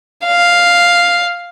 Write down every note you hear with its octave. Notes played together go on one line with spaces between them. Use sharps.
F5